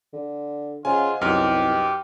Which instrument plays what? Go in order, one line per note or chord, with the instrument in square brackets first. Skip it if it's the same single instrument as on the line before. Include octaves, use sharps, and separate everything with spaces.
[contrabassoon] D3
[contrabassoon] C#3 [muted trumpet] F4 [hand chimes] C5 D#5 F#5 [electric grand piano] G#5
[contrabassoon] C2 [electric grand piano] F#2 F6 [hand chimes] D#4 B4 D#5 [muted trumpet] G4